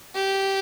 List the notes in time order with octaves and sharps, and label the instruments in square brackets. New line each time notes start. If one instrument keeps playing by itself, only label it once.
[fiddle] G4